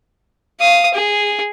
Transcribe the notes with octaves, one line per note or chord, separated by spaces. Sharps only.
F5 D#6
G#4